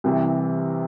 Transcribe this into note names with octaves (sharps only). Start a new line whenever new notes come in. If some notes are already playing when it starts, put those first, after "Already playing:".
C2 C3 E3